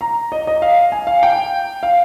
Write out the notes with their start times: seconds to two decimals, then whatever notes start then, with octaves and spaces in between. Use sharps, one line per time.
0.01 A#5
0.32 D#5
0.47 D#5
0.62 F5
0.92 G#5
1.07 F5
1.23 G5
1.83 F5